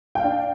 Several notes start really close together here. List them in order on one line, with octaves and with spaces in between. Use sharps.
G5 F5 D4